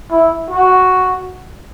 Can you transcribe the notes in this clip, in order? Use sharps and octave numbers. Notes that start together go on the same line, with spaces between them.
E4
F#4